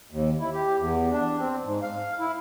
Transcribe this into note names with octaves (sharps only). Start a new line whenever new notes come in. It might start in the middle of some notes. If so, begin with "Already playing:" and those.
D#2
E4
G4
E2
D4
C4
G#2
F5
E4